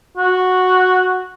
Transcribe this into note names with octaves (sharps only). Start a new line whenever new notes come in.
F#4